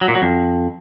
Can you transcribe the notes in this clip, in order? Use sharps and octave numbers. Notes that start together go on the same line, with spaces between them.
F#3
A#2
F#3
F2